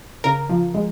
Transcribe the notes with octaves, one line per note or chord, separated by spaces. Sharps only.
C#3 A#4
F3
G#3